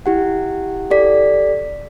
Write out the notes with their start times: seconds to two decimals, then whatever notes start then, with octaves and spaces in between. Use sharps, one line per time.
0.06 E4 G4 F#5
0.91 G4 A4 D5 B6